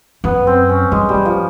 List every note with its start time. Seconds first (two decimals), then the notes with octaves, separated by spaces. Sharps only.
0.24 F#2 B3
0.47 C4
0.69 C#4
0.92 G2 G#3
1.09 G3
1.14 G2
1.25 F3